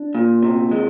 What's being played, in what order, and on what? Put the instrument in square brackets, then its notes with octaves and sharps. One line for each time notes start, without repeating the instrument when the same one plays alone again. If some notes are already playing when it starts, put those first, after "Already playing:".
Already playing: [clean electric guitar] D4
A#2
C3
G#3